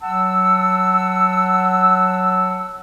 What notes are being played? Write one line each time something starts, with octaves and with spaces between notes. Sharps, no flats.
F#3 F#5 A5 E6